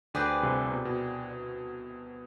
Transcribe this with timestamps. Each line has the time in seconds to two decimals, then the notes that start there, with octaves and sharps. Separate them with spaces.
0.14 D2 D3 C4 G#4 B4 D5
0.43 C2 C3
0.71 B2
0.85 B2